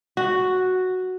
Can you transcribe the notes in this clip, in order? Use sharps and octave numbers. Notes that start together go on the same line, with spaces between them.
F#4